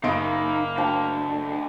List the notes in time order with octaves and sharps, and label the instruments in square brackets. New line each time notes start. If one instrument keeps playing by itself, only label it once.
[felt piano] F#1 C6 D7 [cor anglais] A#3 [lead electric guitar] D#4 F5 [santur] D#5 B5
[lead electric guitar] D2 D3 [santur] G5 A5